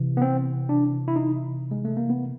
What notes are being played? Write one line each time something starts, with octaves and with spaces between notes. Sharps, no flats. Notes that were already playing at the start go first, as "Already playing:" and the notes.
Already playing: C3 E3
B3
C4
D4
E4
D#4
G#3
A3
A#3
B3